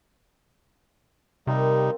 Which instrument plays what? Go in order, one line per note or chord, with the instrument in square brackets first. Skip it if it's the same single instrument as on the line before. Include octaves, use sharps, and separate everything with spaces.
[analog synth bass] C3 [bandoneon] G3 D#4 [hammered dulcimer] C4 F4 A#4